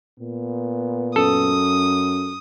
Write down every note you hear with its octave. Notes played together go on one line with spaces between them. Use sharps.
A#2 B3
F#2 A4 D#6